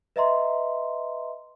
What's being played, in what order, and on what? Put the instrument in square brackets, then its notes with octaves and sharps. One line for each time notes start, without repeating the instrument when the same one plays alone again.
[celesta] B4 D#5 E5 A#5 C6